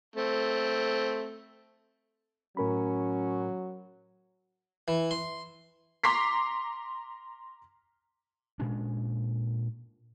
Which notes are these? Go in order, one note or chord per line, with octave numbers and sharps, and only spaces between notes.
A3 C4
A2 F#3 C#4 A#4 B5
E3
C6
A#5 C6 D6 B6 C7
A#2 G#3 C#4 D4